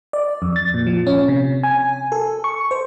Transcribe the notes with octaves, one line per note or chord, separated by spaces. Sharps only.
D5
F2
A6
A#2
F3
C#4
C3
G#5
A4
C#6
C5